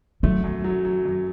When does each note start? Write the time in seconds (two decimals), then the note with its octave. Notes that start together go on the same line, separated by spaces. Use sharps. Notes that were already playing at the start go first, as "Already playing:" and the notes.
0.23 F#3 A3
0.44 F#2
0.64 F#3
0.85 F#3
1.05 F#2